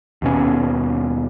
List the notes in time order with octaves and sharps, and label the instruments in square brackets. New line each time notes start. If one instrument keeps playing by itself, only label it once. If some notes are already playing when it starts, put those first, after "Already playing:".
[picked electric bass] D#2 B2 C#4